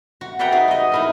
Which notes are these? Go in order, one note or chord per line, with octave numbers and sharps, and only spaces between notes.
F#4
B4 D5 E5 F#5 G5 A#5
D#4 F#4 G#4
F#4 D#5
D#4 E4 A#4